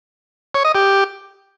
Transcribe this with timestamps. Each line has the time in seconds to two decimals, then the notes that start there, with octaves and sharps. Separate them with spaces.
0.55 C#5
0.65 D#5
0.75 G4